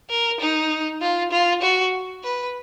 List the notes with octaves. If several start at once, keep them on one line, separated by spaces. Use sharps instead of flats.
A#4
D#4
F4
F4
F#4
B4